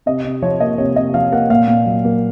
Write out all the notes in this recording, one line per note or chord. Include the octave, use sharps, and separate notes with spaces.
C3 D#5
C3
F3 C#5
A#3 D#5
C3 C#5
C3 D#5
F3 F5
A#3 F#5
A#2 F5
A#2
F#3
A#3